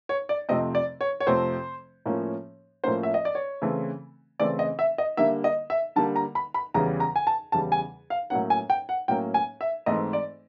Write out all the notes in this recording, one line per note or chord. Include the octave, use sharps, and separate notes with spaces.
C#5
D5
F2 C3 F3 A3 C4 D#5
D5
C#5
C#5
F2 C3 F3 A3 C4 C5
A2 F3 A#3 C#4
A2 F3 A#3 C#4 C5
E5
D#5
D5
C#5
C#3 E3 A3 C4
C#3 E3 A3 C4 D5
D#5
E5
D#5
D3 G3 A#3 E5
D#5
E5
D3 G3 A#3 A5
A#5
B5
B5
E2 C#3 E3 G3 A#5
A#5
G#5
A5
E2 C#3 E3 G3 A5
G#5
F5
A2 F#3 A#3 C#4 F#5
G#5
G5
F#5
A2 F#3 A#3 C#4 G5
G#5
E5
G#2 E3 A3 C4 D#5
D5